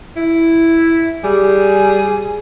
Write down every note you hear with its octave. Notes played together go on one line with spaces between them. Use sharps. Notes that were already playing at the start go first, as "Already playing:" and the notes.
E4
G3 G#4